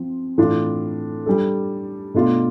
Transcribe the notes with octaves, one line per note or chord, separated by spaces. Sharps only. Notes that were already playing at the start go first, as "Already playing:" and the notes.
Already playing: F3 C4
A2 E3 A3 D4 F4
G3 D4 A4
B2 A3 D4 F4